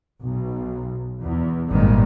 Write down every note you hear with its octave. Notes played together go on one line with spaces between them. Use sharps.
B1
E2
G#1 G2 A#2 D#3 G3 G#3